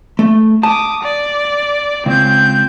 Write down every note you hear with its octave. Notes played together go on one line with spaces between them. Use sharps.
A3
A5 D6 D#6
D5
C#2 C4 G6